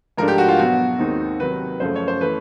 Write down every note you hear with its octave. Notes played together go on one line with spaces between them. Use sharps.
G#2 F3 A3 D4 A#4
G4
F#4
F4
B2 F#3 B3 F#4
D#2 D#3 G#3 C4 D#4
C3 D#3 F#3 B4
F#2 C#3 F3 A3 C5
C#5
C5
E3 A3 B4